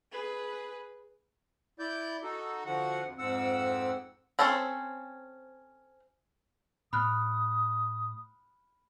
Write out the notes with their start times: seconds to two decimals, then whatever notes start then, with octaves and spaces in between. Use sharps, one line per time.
0.12 G#4 B4
1.79 E4 D5 G6
2.23 D#4 F#4 A4
2.66 D3 F3 F#4 F#5
3.05 F2
3.18 F2 G#2 C4 F#5 E6
4.39 C4 C#4 A4 C5 C#5
6.93 A2 B5 D#6 F6 F#6